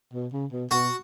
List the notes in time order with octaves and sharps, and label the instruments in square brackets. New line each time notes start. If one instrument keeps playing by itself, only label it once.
[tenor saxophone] B2
C#3
B2
[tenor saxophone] B2 [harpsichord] F#4